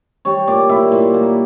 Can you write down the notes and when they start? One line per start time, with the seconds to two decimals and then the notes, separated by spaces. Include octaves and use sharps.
0.25 G3 C#5
0.47 A#2 D5
0.69 A#2 E4
0.92 A#2
1.14 A#3